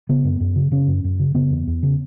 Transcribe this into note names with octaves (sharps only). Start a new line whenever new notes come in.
C#3 B3
F#2
F#2
C#3
C#3 C#4
F#2
F#2
C#3
C#3 B3
E2
E2
C#3